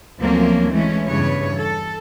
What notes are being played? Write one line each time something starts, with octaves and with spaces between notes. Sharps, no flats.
D2 F3 F#3 A#3 C4 C#4
E3 G#3 A3 C#4
E2 G2 C#3 B4 C#5
A4